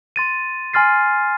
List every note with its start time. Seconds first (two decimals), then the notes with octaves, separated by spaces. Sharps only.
0.16 C6 A6 D#7
0.73 G#5 C6 F6 A6 C7